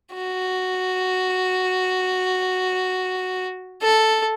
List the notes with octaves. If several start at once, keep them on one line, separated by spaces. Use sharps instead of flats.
F#4
A4